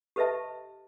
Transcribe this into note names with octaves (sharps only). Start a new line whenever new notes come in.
G4 A4 B4 D#5 E5 A5